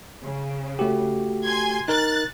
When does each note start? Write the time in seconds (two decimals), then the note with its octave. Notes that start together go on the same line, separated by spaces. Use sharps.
0.23 C#3
0.79 A3 F#4 G4
1.44 G#5 C6 G#6
1.88 D#4 A#4 F#6 A6